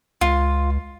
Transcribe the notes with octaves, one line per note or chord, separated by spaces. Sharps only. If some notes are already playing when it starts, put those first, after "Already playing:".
C#2 F4